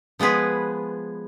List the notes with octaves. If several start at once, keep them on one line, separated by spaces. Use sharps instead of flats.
F3 G#3 B3 G#4 B4